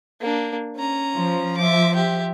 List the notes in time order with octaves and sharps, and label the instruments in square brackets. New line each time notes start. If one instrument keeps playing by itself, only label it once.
[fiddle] A#3 D4
C#4 A#5
[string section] F3
[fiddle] E5 D6
G4 E5